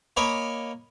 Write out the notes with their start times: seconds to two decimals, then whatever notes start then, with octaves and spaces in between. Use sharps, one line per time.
0.17 A#3 C#5 D#5 G#5 B5 D6